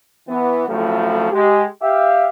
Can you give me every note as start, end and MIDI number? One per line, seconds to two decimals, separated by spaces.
0.28 0.63 52
0.28 0.63 59
0.68 1.28 41
0.68 1.28 45
0.68 1.28 49
0.68 1.28 53
0.68 1.28 54
0.68 1.28 57
1.32 1.64 56
1.32 1.64 67
1.82 2.28 67
1.82 2.28 76
1.82 2.28 77